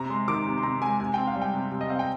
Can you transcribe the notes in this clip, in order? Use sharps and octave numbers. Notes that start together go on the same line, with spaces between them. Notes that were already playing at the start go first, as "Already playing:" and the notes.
Already playing: C3 A#5
G#3 C6
D#3 D6
C3
C6
C3 A#5
G#3 G#5
C3 G#5
C4 G5
F5
G3
G5
C3
C3
D#5
C4 F5
G5